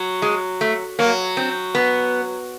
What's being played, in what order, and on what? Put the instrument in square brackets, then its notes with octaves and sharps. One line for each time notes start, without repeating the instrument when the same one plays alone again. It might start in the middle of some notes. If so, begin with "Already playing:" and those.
Already playing: [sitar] F#3
[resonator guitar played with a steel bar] G#3
A3
[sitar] F#3 [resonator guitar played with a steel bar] A#3
[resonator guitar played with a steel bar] C4
B3